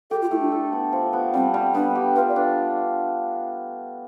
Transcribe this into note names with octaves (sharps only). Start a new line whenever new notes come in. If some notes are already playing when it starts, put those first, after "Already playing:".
G4 A4
F4
A3 E4
D4
A4
B3
F3
B3
G3 C4
G3
B3 D4
G4
F4 B4
D5
D4